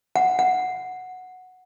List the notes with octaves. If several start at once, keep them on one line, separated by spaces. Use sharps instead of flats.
F#5
F#5